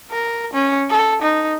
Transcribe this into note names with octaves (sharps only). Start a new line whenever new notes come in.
A#4
C#4
A4
D#4